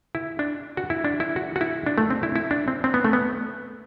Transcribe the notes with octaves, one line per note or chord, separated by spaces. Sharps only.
E4
D4
F#4
E4
D4
E4
F#4
F#4
E4
D4
A3
C4
E4
E4
D4
C4
C4
B3
A3
B3